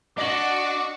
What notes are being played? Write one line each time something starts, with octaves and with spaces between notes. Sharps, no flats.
D4 F#4 D#5 D6 A#6 F#7